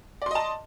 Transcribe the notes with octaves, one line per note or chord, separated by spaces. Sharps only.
D5 D#5 A5 C6